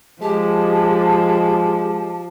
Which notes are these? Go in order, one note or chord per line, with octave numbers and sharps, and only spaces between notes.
F3 G#3 G4 A5